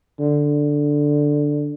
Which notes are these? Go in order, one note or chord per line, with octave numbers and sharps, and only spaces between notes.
D3